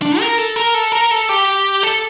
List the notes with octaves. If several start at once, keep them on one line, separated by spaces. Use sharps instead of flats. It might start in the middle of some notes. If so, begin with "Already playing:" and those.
D4
A#4
A4
A#4
A4
A#4
A4
G4
A4